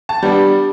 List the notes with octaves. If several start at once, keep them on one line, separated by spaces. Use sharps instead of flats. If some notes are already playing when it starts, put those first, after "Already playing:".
A5
G3 B3 D4